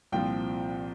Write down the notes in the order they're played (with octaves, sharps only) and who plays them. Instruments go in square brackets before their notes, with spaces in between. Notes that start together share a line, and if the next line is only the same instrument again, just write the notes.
[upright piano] C2 A#2 F3 C4 G5